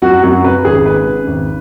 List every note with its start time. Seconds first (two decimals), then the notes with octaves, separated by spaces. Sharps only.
0.02 F#2 F#4
0.23 F#2 F#4
0.44 C#3 B4
0.65 G#1 G#4
0.86 G#3 B4
1.07 C#3
1.27 G#1